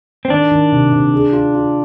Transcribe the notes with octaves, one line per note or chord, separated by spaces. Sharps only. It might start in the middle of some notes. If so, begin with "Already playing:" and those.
C4
D#3 D4
D#3
C3
C3
G#4
F4
F4